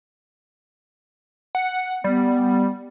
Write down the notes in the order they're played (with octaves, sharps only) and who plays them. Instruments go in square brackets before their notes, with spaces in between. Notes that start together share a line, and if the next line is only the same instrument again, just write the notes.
[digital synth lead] F#5
[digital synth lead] G3 [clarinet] B3